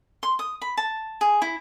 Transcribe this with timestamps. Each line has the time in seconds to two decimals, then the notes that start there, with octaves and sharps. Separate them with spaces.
0.23 C6
0.39 D#6
0.62 B5
0.77 A5
1.21 G#4
1.42 E4